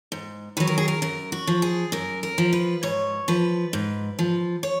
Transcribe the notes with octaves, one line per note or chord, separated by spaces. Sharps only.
G#2
D#3 F#3 B4
A#4
G#4
A#4
F#2 A#4
F#4
F3
G#4
F#2 A#4
A#4
F3
B4
G#2 C#5
F3 B4
G#2
F3
C#5